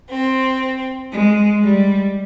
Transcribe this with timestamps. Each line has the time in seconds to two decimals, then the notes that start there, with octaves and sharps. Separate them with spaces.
0.11 C4
1.12 G#3
1.63 G3